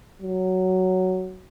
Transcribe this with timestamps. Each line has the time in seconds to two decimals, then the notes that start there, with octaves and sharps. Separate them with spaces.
0.21 F#3